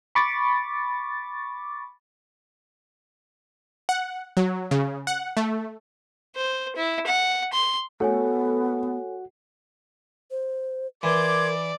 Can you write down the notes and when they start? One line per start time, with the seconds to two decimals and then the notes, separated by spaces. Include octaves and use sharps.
0.15 B5 C#6 D6 A6
3.89 F#5
4.37 F#3
4.71 C#3
5.07 F#5
5.37 A3
6.36 C5
6.76 E4
7.06 F#5
7.53 C6
8.00 A3 B3 F#4 A4 C#5 F#5 G#5
10.31 C5
11.03 E3 A#4 D5 C6 D6 G#6